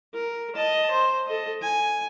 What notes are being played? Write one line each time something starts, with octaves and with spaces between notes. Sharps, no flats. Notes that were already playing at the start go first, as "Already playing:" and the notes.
A#4
D#5 A5
C5
A4 D#5
G#5